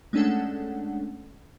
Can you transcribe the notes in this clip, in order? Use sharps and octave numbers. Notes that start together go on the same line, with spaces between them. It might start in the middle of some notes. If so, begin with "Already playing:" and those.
G#3 A3 C#4 D4 A4 F#5